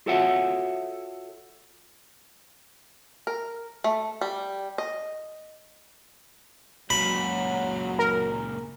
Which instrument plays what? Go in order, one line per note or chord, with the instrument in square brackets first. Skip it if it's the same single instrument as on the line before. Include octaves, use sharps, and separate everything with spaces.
[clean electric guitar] F4 F#4 A4 C#5 E5 F#5
[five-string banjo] A#4
A3
G3
D#5
[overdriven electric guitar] C#2 A#2 [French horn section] F#3 [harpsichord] B5
[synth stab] A#4